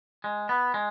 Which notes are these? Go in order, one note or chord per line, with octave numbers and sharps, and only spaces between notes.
G#3
B3
G#3